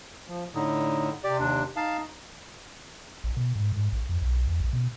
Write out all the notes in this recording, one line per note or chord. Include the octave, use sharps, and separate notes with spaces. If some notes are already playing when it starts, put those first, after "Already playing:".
F3
A2 D3 D#4
C3 G4 D5
D#2 D4
D#4 F5 A5
A1
B2
G#2
G#2
A1
F2
B1
E2
A#1
B2